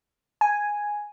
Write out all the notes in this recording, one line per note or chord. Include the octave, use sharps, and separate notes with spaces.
G#5